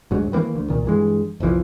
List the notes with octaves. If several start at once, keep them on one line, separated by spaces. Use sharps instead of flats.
D2 G#2 F#3
D#3 E3 A3 A#3
D2
C2 A#2 D#3
G2 E3 G#3
F1 B1 E3 F3